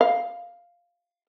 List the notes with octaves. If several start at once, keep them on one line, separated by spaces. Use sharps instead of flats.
F5